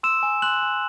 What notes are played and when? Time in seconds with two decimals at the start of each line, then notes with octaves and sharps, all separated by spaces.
0.03 C6 E6 E7
0.23 G#5
0.42 C6 F#6 F#7
0.62 G#5